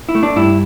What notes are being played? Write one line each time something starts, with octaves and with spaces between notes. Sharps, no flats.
E4
A3
D4
G2 E4